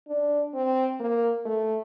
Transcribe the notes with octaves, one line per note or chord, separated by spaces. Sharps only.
D4
C4
A#3
A3